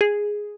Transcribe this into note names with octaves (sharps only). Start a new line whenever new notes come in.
G#4